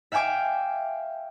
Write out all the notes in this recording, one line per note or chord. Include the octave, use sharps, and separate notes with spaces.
E5 F5 G5 G#5 D6